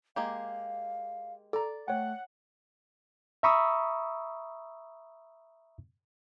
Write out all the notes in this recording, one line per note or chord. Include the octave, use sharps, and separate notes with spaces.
G#3 A#3 G4 F5
A4 D5 A#5
A3 C#5 F#5 G5
E5 A#5 B5 C#6 D#6 E6